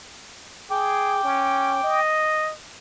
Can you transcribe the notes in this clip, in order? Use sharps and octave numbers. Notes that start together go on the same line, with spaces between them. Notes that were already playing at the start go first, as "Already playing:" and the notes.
G#4 G5 D6
C#4
D#5